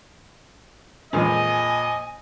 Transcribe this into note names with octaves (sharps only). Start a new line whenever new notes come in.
F2 A#2 E3 G#3 C#4 G#4 D#5 G#5